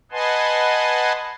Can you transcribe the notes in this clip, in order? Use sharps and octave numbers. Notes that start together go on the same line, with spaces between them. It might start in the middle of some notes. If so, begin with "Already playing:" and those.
B4 D#5 F#5 G#5 A5 C6